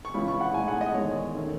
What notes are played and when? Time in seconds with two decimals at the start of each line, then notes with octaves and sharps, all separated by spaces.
0.05 C#6
0.14 C#2 C#3 E3 G#3 C#4 B5
0.28 C#6
0.41 F#5
0.54 A2 G#3 D#4 G#5
0.68 F#5
0.81 D#5
0.95 E2 D#3 G#3 C#5
1.35 D#3 A3 C#4